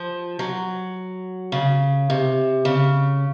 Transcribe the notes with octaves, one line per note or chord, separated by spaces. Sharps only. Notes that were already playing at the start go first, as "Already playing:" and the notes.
Already playing: F3
F#3
C#3
C3
C#3